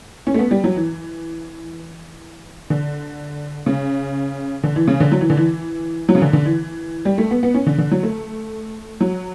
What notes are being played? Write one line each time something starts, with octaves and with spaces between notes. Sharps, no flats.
C#4
A3
B3
G3
F#3
E3
D3
C#3
D3
E3
C#3
D3
F#3
E3
D3
E3
F#3
C#3
D3
D3
E3
G3
A3
B3
B3
C#4
D3
D3
F#3
A3
F#3